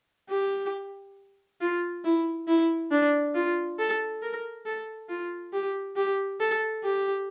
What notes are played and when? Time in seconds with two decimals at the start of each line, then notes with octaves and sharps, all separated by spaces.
0.29 G4
1.61 F4
2.04 E4
2.47 E4
2.91 D4
3.35 F4
3.79 A4
4.22 A#4
4.65 A4
5.09 F4
5.53 G4
5.96 G4
6.40 A4
6.84 G4